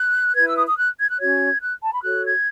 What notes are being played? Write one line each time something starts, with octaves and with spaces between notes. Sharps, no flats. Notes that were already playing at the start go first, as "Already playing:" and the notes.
Already playing: F#6
E4 B4 G#6
E6
D#6
D#6
F#6
G#6
F#6
C#4 F#4 C#5 G#6
F#6
A5
B5
F#4 A4 C#5 F#6
G#6